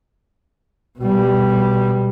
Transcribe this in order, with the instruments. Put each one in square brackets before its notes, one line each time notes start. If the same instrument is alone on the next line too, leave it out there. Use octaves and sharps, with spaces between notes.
[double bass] B2 G3